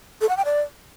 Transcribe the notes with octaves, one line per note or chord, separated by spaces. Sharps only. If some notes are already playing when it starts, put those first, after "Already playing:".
A4
F#5
G5
D5